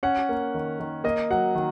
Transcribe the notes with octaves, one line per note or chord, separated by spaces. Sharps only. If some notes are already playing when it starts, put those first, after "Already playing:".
C#4 F#5
A#3
D#3
D#3
A#3 D#5
F#3 F#5
D#3